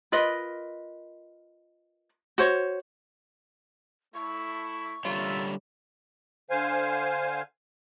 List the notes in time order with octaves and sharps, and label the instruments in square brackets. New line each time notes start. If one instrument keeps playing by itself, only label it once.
[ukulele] F4 A#4 B4 D#5
F#4 C5 C#5
[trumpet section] A3 E4 [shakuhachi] C#6
[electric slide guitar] D3 G3 C#5 [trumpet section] A#3 A#4 E5 [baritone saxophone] F4
[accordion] D3 C5 F5 G#5